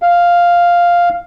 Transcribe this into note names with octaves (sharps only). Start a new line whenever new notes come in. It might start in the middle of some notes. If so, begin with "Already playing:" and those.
F5